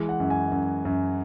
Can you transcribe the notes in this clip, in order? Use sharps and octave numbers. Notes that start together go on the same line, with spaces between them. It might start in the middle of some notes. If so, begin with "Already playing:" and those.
Already playing: E3 G#3
F#5
F#2
G#5
F#2
F#2